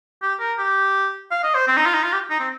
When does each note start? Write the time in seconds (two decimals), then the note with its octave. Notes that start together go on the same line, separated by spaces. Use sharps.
0.22 G4
0.40 A#4
0.58 G4
1.31 F5
1.43 D#5
1.54 C5
1.67 C4
1.77 D#4
1.86 F4
1.94 D#4
2.03 F4
2.12 G4
2.30 D#4
2.40 C4